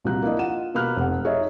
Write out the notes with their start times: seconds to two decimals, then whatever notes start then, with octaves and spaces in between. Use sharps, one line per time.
0.04 C2 A#2 F3 F#4 A#5 F#6
0.23 A#3 D4 E4 A#4 D#5
0.39 F4 F#5 D#7 E7
0.74 B2 A#3 B5 F6 F#6
0.96 F1 F#5
1.24 D#4 G#4 C#5 D#5 E5